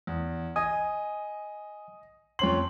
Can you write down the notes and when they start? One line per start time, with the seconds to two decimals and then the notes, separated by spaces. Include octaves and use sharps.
0.07 E2
0.56 D#5 G#5 D#6
2.39 F2 C#4 C6 F#7